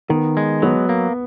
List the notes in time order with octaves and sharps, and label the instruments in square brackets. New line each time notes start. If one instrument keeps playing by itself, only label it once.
[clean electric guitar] D#3 [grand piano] B3
[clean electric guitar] G#3
[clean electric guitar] F#3 [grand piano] B3
[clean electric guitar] A#3